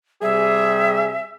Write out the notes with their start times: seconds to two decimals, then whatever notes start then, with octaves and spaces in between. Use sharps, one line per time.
0.22 C3 G3 G#4 E5